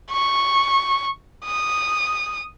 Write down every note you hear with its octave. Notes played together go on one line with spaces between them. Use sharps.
C#6
D#6